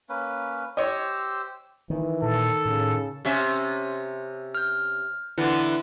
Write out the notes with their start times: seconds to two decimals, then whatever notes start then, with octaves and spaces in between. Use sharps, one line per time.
0.09 A#3 C#4 B4
0.77 G4 C5 C#5 D#5 E6
1.90 D#3 E3
2.22 A#2 A4
2.65 A2 C#3
3.25 C3 C#4 E5
4.55 F6 G6
5.38 D3 E3 B3 E4